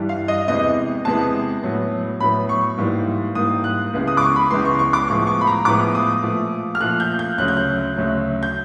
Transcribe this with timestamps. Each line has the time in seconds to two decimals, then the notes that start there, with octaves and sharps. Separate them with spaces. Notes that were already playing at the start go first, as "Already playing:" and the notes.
Already playing: G2 E3 G3
0.09 F5
0.28 D#5
0.48 E2 C3 E3 G#3 B3 D#5
1.05 E2 C3 E3 G#3 B3 A5
1.63 A2 F#3 B3
2.20 A2 F#3 B3 B5
2.49 C#6
2.78 G#2 E3 G3 A#3
3.35 G#2 E3 G3 A#3 D#6
3.64 F#6
3.93 C#2 C#3 E3 G#3 B3
4.08 D#6
4.17 D6
4.22 C#6
4.36 B5
4.51 C#2 C#3 E3 G#3 B3 C6
4.65 C#6
4.75 C6
4.79 C#6
4.93 D6
5.08 A2 F3 G#3 B3 C#6
5.27 C#6
5.41 B5
5.47 A#5
5.65 A2 F3 G#3 B3 D6
5.95 D#6
6.23 A#2 F3 A3
6.75 F6
6.81 A#2 F3 A3 F#6
7.00 G6
7.19 G6
7.38 D2 C#3 F#3 A3 F#6
7.48 G6
7.57 F#6
7.96 D2 C#3 F#3 A3
8.43 G6